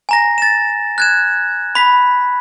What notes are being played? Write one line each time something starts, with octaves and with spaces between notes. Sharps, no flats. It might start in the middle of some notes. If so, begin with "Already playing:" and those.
G#5 A#5 A#6
A6 E7
F#6 G#6 E7
B5 B6